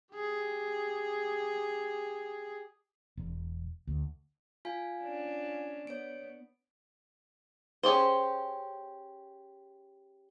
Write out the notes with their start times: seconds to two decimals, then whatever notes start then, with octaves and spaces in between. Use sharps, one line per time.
0.14 G4 G#4
3.17 E1
3.87 D2
4.65 F4 F5 G#5
5.02 C#4 D4
5.87 B3 C#5 D7
7.83 C#4 G4 G#4 C5